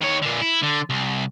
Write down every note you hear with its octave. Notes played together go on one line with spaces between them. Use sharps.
D#3 C#5
A#2 D3
E4
D3
C2